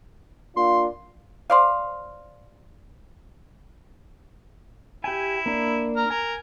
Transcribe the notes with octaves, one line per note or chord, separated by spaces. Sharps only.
A#3 D4 F4 C6
C5 D5 F5
E4 G4 G#5
A#3 D4
A#4 A#5 F6
A#4 G#5